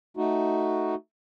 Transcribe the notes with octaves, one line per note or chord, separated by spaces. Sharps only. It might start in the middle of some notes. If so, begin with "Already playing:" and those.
A3 D#4 F#4